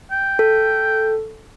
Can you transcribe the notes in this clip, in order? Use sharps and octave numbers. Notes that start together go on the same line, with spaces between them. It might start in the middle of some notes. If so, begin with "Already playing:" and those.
G5
A4